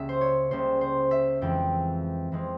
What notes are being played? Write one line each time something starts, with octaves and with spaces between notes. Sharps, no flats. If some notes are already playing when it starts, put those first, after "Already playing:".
Already playing: C#2 C#3 G3 A#3 C#4 E5
C5
C#5
C#2 C#3 G3 A#3 C#4 C5
C5
E5
F2 E3 G#3 C4 G5
F2 E3 G#3 C4